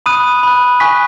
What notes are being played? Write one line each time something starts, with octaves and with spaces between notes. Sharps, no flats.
B5 D#6 F#6 D#7
B5 F#6
G#5 C#6 F#6 B6